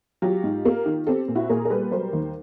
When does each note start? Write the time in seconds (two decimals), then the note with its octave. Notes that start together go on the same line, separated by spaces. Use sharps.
0.22 F#3 F4 G4
0.43 G#2
0.65 A#3
0.86 D#3
1.07 C4 G4 A4
1.28 A#2
1.35 E4 F#4
1.49 A#2 G#4 A#4
1.65 A#4
1.70 G3 A4 B4
1.91 F#3 A#4 C5
2.13 D#2